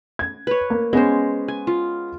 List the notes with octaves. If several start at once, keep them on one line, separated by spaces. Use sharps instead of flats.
G#6
B4 C#5
A#3
G#3 B3 C#4 C5
G#5
F4